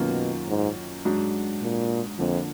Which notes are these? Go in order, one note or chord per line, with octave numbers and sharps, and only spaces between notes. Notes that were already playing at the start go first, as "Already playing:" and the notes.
Already playing: F#2 B2 D#3 A#3 F4
G#2
G#2 F#3 D4 F#4
A#2
F2 D3 F3 A#3 D4